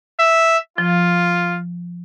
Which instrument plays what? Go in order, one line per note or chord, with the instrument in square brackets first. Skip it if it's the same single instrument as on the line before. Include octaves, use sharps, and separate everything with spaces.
[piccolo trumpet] E5
[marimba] F3 [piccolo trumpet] F4